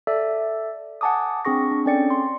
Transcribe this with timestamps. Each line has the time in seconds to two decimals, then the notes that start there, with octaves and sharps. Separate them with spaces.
0.07 A4 D5 E5
1.01 F#5 G#5 A5 D6 D#6
1.45 C4 D4 G#4 C#6 A#6
1.72 D4
1.85 C4 C#4 A4 D5 G5 C#7
2.10 C6